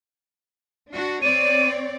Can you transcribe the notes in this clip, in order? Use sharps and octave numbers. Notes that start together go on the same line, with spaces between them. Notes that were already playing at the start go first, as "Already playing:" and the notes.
D4 F#4
C4 C#5 D5 D#7